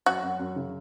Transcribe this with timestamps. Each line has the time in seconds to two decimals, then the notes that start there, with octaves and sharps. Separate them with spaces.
0.06 F#2 F#4
0.23 F#2
0.39 F#2
0.56 C#3